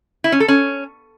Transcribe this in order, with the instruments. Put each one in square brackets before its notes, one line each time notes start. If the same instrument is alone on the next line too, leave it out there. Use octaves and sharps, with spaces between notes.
[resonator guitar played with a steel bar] E4
C#4
A4
C#4